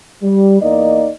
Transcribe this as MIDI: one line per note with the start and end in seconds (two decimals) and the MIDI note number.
0.23 0.59 55
0.61 1.10 40
0.61 1.10 58
0.61 1.10 63
0.61 1.10 74
0.61 1.10 75